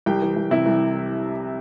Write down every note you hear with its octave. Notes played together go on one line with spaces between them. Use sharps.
C2 G4 G5
E3
C2
C3 E4 E5
C2